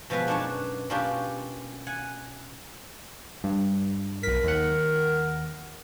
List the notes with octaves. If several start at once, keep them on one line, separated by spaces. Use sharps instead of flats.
B2 F3 G#3 B3 B4
F#2 D4 D#4 C#5 F#5 A5
B2 A#3 C#4 D4 F4 G4
F#5 G#5
G2
B1 A#4 B6
D#2 F#5